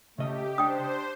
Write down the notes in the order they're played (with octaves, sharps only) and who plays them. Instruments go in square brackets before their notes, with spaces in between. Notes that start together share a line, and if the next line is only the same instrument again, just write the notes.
[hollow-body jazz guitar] C#3 D#5 [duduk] A3 [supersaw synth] G4
[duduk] D4 [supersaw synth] C5 [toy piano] G5 D#6